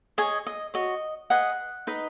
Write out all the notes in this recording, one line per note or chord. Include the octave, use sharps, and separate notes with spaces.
G#4 C#5 D#5 G#5
D#5
F#4 C#5 D#5
G#4 B4 D#5 F#5
D#4 B4 D#5